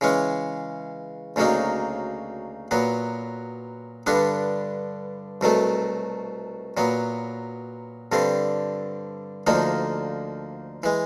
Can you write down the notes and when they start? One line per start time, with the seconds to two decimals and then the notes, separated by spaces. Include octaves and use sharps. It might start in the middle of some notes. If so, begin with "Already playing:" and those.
0.01 C#3 E3 G#3 C#4
1.36 D2 C#3 F#3 A#3 D#4
2.71 A#2 F#3 B3
4.06 G2 D3 G3 B3 D4
5.41 C2 B2 F#3 A3
6.77 A#2 F#3 B3
8.12 G2 D3 G3 C4
9.47 D2 D3 F3 A#3 D#4
10.83 E3 G#3